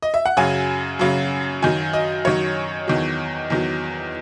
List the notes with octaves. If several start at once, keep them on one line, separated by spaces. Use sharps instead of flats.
D#5
E5
F#5
F#2 C#3 F#3 G#5
F#2 C#3 F#3
F#2 D#3 F#3 G#5
D#5
F#2 D#3 F#3 C#5
E2 D#3 F#3
E2 D#3 F#3